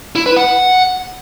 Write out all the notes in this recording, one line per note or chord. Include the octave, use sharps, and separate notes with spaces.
E4
B4
F#5